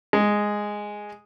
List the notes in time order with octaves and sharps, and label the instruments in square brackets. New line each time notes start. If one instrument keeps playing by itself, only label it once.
[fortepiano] G#3